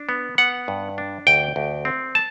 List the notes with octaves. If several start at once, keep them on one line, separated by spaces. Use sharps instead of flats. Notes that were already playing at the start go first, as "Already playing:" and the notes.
Already playing: D4
B3
B3 F#5
G2
D4
D2 G5
D2
C4
A5